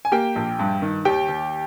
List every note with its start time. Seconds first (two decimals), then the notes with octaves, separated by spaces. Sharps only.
0.05 G#5
0.12 A#3 G4 G5
0.36 A#1
0.59 G2
0.82 D#3
1.05 D#2 G4 G5
1.29 D#2